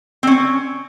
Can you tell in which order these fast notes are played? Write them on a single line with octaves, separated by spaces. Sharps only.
C4 C#4 C#5